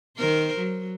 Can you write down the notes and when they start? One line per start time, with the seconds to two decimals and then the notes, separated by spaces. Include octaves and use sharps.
0.18 D#3 A#4 C5
0.57 F#3